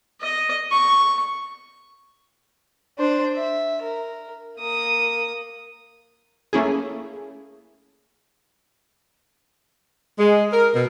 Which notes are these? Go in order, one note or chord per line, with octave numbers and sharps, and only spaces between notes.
D#5
C#6
D4 C5
E5
A#4
A#3 D#6
A3 A#3 C#4 E4 G#4
G#3
A#4
B2